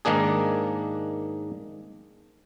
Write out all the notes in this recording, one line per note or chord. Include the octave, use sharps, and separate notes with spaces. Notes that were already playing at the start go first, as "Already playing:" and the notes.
G#2 D#3 A#3 D4 G#4